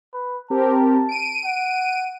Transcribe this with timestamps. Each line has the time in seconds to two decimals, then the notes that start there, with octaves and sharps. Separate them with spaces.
0.14 B4
0.50 C4 G4 A#4 A5
1.09 D7 D#7
1.44 F#5